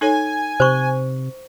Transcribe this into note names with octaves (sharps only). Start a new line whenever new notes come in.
D#4 A4 C#5 G#5
C3 C5 C#6